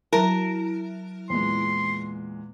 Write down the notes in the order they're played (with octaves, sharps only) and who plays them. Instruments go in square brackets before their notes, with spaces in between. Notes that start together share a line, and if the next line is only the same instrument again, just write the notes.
[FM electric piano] F#3 E4 [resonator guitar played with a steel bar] A#4 [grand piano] A5
[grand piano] E2 A#2 G#3 [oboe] C6